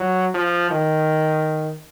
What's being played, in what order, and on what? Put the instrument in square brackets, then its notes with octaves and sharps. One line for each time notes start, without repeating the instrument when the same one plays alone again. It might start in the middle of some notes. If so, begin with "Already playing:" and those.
Already playing: [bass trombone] F#3
F3
D#3